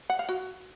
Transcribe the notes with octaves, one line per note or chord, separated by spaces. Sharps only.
F#5
F5
F#4